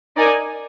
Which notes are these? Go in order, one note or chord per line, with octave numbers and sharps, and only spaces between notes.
D#4 A#4 D5 G#5